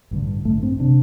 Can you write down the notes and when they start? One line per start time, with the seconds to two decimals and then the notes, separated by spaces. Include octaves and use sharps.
0.11 A1 G2 D3
0.45 A1 G2 D3 A3
0.63 C4
0.80 C3 D4